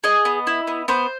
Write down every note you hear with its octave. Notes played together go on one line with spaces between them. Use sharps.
G#4 D#5
B3
E4
B3
B3 C5